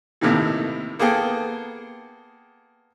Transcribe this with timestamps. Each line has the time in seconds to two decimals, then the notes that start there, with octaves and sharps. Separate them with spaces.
0.21 D#2 A2 C3 D#3 E3
0.99 A#3 B3 G#4 A4 G5